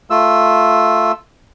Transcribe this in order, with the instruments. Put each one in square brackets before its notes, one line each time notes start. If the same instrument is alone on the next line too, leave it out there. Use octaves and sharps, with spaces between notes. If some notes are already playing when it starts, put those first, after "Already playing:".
[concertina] A3 F4 E6